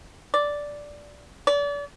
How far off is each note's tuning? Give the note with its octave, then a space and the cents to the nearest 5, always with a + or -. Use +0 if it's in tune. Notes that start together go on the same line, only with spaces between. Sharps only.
D5 -5
D5 -35